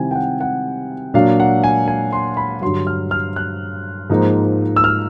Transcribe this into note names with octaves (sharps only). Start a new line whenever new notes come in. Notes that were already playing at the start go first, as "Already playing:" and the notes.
Already playing: C3 D#3 G3 C4 E4 G5 G#5
G5
F#5
F#5
A#2 F#3 A#3 D4 F5
F#5
G#5
G#5
C6
B5
G2 D3 F#3 C6
F6
F6
F#6
G#2 F3 A#3 D#4
E6
F6